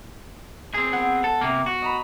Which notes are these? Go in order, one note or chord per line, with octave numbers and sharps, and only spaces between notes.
C4 G#4
B3 F#5 G#6
A4
C3 A#3
F#4
D#5 A#5 B5